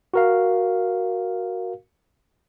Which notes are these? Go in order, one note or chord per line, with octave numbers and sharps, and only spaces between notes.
F#4 A#4 F5